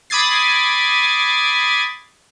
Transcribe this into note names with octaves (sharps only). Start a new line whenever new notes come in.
B5 D6 D#6 G#6 A6 C7